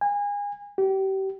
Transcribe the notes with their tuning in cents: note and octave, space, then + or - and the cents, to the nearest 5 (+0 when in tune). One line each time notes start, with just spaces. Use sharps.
G#5 -30
G4 -30